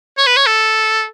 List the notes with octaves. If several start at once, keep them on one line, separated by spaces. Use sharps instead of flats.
C#5
B4
C#5
A4